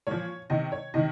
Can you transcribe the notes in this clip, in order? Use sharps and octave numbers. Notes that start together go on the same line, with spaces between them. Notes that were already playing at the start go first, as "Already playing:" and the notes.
A#2 F3 C#5
C3 D#3 D#5
C#5
C3 D#3 D#5